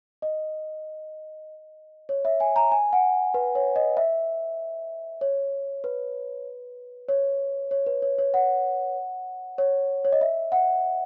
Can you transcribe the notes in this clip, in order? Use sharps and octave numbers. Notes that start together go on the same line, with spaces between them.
D#5
C#5
E5
G#5
A#5
G#5
F#5
B4
C#5
D#5
E5
C#5
B4
C#5
C#5
B4
C#5
C#5
F#5
C#5
C#5
D#5
E5
F#5